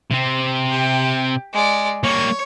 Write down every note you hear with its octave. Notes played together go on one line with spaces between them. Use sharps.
C3 C4
G4
G#3 D5
G3 A#3 C#5